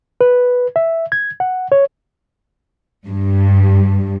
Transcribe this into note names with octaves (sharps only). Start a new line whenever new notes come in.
B4
E5
G#6
F#5
C#5
G2